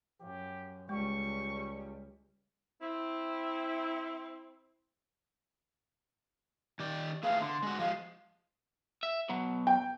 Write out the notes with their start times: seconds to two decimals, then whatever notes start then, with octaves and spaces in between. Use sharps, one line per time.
0.20 F#2 G4
0.89 C#2 G3 G#3 C#6
2.81 C4 E4
6.80 D#3 G4 D5
7.23 A3 G#4 B4 F5
7.41 D3 C6
7.63 G#3 F#4
7.79 F3 G#3 F5
9.03 E5
9.29 B2 F#3
9.67 G5